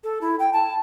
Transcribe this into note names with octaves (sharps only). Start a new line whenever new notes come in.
A4
E4
G5
A5